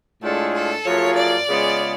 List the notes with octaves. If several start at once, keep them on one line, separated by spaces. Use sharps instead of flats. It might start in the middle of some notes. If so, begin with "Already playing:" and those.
A2 G#3 D4 F4 G#4 A4
A4
F#2 F3 A3 F4 G#4 C#5
D5
C#3 G#3 B3 F4 G#4